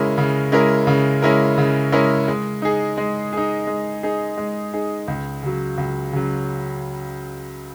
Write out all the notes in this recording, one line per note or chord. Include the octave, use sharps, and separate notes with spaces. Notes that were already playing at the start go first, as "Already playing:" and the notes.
Already playing: C#3 G#3 C#4 E4 A#4
C#3
G#3 C#4 E4 A#4
C#3
G#3 C#4 E4 A#4
C#3
G#3 C#4 E4 A#4
G#3
D#4 G#4
G#3
D#4 G#4
G#3
D#4 G#4
G#3
D#4 G#4
C#2
C#3 F#3
C#2
C#3 F#3